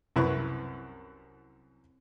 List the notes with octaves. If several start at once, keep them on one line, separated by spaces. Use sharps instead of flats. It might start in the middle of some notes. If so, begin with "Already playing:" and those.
C2 F#2 E4 B4 C#6